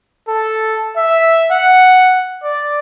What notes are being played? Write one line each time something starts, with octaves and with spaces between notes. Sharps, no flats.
A4
E5
F#5
D5